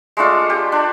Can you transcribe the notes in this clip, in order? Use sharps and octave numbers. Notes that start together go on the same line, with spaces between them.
G#3 A3 D4 F4
G4
D4